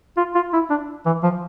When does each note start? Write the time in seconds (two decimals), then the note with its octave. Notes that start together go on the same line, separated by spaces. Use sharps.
0.17 F4
0.35 F4
0.53 E4
0.70 D4
1.06 E3
1.23 F3